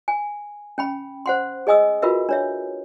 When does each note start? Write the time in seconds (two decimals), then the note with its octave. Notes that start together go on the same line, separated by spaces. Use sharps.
0.08 G#5
0.78 C#4 G5 B5
1.26 C5 F#5 C6
1.67 G#4 D#5 G#5 D#6 E6
2.02 F4 F#4 A#4 B4 E5
2.29 D4 C#5 E5